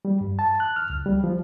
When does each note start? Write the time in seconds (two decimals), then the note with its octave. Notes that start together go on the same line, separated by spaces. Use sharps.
0.05 G3
0.21 G2
0.39 A5
0.60 F#6
0.76 F6
0.90 C#2
1.06 G3
1.24 F3